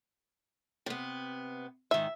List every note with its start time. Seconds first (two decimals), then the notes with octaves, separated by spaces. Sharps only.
0.86 C3 B3
1.91 G#2 D#3 E5